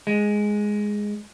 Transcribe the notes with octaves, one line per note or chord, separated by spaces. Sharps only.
G#3